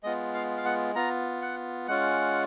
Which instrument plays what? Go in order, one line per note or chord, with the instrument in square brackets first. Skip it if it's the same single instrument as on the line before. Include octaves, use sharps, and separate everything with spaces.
[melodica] G#3 B3 F4 D#5
F5
F5
F#5
B3 F4 A#5
F#5
G#3 C#4 F4 F#5